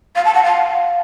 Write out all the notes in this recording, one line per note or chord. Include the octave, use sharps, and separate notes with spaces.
F5
A5
F#5
F5